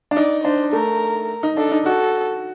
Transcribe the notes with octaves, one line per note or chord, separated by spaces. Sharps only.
D4
D#4 D5
D4 C5
A3 A#4
D#4
D4 A4
D#4
F#4 A4